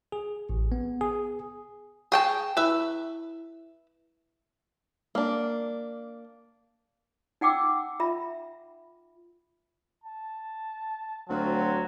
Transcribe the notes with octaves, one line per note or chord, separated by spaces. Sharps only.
G#4
A1
B3
G#4
G#4 G5 A5 C#6
E4 B4 E5 E7
A#3 D4
D#4 F#5 G5 D6 E6
F4 E5 B5
A5
D2 F#3 C4 F4 F#4